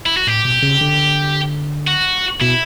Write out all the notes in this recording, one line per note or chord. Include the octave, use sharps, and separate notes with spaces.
E4
F#4
A2 G4
B2
C#3
D3
F#4
B2 E4